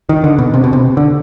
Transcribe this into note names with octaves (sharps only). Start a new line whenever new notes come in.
D#3
D3
B2
C3
B2
C3
D3